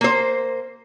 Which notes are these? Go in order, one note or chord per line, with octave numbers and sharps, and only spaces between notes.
A#3 C5